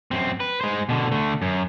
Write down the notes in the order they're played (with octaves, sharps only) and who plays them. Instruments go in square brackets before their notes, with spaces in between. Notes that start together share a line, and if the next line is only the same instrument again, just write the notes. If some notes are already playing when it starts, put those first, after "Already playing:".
[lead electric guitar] F#2 C4
B4
G#3 C5
B2 D3
D3 A3
F#2